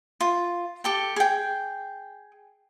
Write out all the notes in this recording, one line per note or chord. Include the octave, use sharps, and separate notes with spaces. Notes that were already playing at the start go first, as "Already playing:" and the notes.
F4
G4 A4 G5
G#4 G5